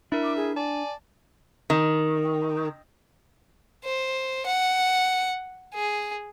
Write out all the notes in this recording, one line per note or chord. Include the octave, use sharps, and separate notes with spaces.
D4 E4 A#4 E5
D6
G#4
D5 G#5 A5
D#3
C5
F#5
G#4